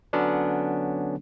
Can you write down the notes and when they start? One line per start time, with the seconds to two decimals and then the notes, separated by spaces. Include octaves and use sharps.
0.13 D3 F#3 B3 C#4 D4